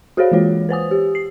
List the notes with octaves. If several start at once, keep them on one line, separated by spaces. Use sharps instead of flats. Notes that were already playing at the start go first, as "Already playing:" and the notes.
F#4 G#4 A4 C5 C#5 F5
E3 G#3 F4 C#5
B4 C5 G#5 D#6
G4
C7